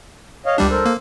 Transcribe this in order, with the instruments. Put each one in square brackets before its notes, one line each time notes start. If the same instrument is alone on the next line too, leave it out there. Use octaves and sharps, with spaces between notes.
[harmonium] C#5 D#5 F5
[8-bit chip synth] C#2 G3 D4 [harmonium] G4
[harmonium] A4 A#4 C5
[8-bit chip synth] A#3